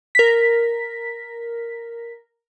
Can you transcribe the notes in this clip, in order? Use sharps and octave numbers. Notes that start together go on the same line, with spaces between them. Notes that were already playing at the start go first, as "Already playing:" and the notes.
A#4 B6